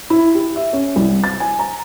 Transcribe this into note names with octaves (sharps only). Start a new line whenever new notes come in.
E4
G4
E5
C#4
C2
A6
G#5
A#5